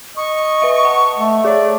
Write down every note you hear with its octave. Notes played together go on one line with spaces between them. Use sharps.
D#5 C#6
B4 E5
F#5 A5
A3
G#4 C#5 D5